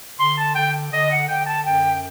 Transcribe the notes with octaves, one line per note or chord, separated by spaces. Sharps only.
D3 C6
A5
D3 G5
D3 D#5
F#5
D3 G5
A5
F#2 G5